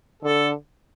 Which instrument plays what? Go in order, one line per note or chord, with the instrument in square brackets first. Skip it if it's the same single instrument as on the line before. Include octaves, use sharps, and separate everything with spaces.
[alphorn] D3 [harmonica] A4